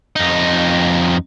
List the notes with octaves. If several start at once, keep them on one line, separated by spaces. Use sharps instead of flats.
F2 D#4